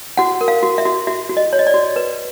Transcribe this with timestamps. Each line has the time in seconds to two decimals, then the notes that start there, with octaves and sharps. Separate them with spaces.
0.17 F#4 F#5
0.41 A#4
0.48 F5
0.63 F#4
0.78 E5
0.85 F#4
1.07 F#4 E5
1.29 F#4
1.37 D#5
1.53 C#5
1.59 D#5
1.67 D5
1.74 F#4
1.96 B4